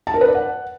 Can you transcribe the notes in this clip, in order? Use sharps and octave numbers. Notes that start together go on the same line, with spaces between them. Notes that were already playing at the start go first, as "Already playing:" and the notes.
A5
A#4
B4
D5
F#5